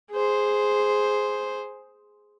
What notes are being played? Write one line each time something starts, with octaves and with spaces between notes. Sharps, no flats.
G#4 C5